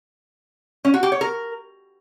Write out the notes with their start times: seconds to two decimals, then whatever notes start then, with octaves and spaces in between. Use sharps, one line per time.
0.85 C#4
0.94 F#4
1.03 G4
1.12 C#5
1.21 A#4